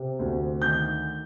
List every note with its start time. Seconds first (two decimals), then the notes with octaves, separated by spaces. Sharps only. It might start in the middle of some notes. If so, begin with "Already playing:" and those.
Already playing: C3
0.19 D2
0.62 D#3 G6